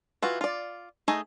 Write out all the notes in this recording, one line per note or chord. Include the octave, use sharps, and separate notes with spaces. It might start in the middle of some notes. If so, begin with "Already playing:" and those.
E3 F4 F#4
F4 D5
A3 D#4 G#4 D#5